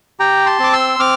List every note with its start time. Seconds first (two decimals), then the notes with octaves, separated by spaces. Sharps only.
0.20 G4 G5 A#5
0.46 A5 C6
0.59 C4 D6
0.73 C6 E6
1.00 C4 D6 F6